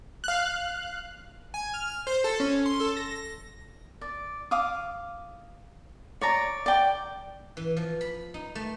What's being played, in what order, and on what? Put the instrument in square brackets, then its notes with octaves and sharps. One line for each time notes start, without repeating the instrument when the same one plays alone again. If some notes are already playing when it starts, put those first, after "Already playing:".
[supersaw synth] F5 F#6
[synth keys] G#5
F6
C5
A4
C#4
C6
A4
A#6
[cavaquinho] D5
F5 D6 D#6
C#5 D5 A#5
D5 G5
[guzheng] E3
F3
B5
D#4
A3